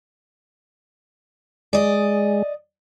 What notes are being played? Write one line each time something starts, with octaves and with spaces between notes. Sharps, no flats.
G#3 D5 D#5